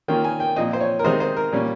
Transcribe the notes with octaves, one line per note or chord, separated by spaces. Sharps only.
D#3 A#3 C#4 F4 G5
G#5
G5
A#2 F3 C4 D#5
C5
C#5
A#4
C3 D#3 G#3 D#4 C5
C5
A#4
A#2 G3 C#4